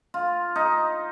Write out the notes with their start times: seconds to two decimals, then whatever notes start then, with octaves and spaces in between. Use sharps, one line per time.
0.14 F4
0.56 D#4